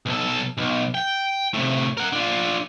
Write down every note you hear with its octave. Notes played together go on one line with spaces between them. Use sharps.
B1 A4
B1
G5
A2 C3
A#4 F#5
D4 F4